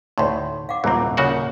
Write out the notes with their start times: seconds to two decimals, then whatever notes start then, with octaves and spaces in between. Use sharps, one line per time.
0.18 D2 A2 D#4 C#5 C6
0.69 F5 F#5 D6
0.84 D#1 E3 C4 A#5
1.17 C#3 F#4 A#4 C#5 F#5